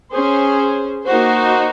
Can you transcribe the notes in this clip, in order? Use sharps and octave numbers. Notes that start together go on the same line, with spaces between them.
C#4 G#4 C5
A#3 D#4 F#4 C5